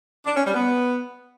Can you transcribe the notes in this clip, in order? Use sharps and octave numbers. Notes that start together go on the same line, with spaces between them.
D4
C#4
G3
B3